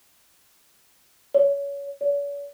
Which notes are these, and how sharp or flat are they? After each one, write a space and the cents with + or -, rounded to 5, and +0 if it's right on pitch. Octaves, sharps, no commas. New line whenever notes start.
C#5 +25
C#5 +45